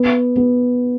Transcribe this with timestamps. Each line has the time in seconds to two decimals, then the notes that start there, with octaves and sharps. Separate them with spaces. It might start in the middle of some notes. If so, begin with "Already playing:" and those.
Already playing: B3
0.37 B3